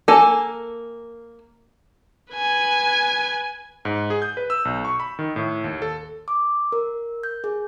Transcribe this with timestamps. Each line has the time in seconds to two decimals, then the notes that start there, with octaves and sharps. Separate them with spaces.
0.08 A#3 A4 G#5
2.34 B4 G#5
3.85 G#2
4.10 G#4
4.22 G6
4.37 B4
4.50 E6
4.65 B1
4.85 C#6
5.00 B5
5.19 D#3
5.36 A2
5.64 D#2
5.82 A4
6.28 D6
6.72 A#4
7.23 G6
7.44 G#4